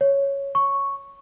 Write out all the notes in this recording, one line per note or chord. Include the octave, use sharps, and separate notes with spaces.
C#5
C#6